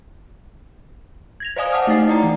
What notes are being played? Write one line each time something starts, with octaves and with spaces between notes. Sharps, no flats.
G#6 A#6 F7
C5 D5 D#5 F5 G#5 D#6
F5 F#5 A5 D6 D#6 F6
A3 D#4 G5 A6 C7
E4 D5 A#5
E3